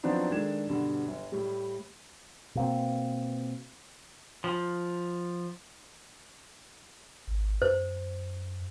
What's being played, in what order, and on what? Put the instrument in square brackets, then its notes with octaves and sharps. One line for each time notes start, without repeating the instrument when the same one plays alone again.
[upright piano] F3 F#3 B3 C4 D4 D#4
D#3 G#3 A3 D4 G#6 E7
G2 B2 D3
G1
A2 G3
[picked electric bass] B2 A#3 C4
[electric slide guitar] F3
[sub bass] G#1
[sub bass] F#2 [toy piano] C5